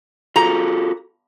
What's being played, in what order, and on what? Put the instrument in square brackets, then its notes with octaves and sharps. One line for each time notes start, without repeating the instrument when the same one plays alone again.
[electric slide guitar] F4 F#4 A4 [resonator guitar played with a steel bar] A#5